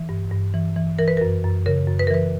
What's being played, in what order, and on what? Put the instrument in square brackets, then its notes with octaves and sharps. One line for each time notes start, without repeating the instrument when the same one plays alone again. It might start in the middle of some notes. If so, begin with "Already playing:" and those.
Already playing: [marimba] E3
G2
G2
E3
E3
E3 A#4
B4
F#2 A#4
F#2
C#3 A#4
F#2
B4
A#4
E3 B4